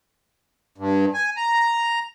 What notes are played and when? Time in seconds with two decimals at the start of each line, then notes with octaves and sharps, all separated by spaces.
0.78 G2
1.14 G#5
1.37 A#5